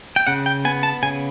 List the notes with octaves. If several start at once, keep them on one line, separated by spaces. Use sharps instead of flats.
G5
C#3 F#5
G5
B3 G#5
A5
C#3 G#5